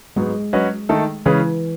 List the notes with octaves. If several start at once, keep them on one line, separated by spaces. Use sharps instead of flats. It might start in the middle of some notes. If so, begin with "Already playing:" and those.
G#2 F#3 G#3 B3
F#3 C#4 F#4 B4 D#5
D#3 A3 D#4 A4
C#3 E3 G#3 C#4 G#4 B4